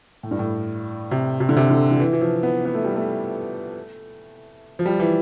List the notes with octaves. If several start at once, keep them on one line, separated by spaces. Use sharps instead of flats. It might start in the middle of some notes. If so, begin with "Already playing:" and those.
A2
G2
A2
C3
C3
D3
C3
D3
D3
E3
E3
F3
B3
B3
A3
G3
A3
F3
G3
E3